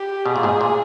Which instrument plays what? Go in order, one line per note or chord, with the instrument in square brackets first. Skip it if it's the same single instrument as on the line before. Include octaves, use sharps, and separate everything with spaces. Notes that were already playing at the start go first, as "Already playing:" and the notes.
Already playing: [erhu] G4
[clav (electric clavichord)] B2 [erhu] G#4
[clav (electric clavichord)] A#2
G#2 B2
A#2